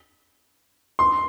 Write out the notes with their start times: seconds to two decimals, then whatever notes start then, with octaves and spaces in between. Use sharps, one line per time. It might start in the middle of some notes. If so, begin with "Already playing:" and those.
0.99 C6